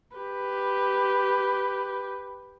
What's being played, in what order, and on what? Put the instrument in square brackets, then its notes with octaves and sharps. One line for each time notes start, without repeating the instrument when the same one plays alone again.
[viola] G4 B4